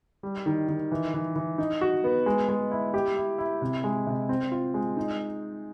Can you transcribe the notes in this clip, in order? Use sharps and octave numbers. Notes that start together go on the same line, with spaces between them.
G3
D#3
D#3
E3
E3
E3
D#4
F#4
B3
G#3
G#3
E4
G4
E4
E4
C3
G#3
C3
C4
F4
G#3
D#4